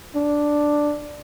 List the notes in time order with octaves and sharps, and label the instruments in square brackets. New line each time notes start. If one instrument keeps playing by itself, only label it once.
[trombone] D4